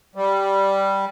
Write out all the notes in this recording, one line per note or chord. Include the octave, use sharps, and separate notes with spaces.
G3